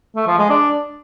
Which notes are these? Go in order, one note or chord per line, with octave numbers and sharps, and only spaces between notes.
A3
F3
G#3
D4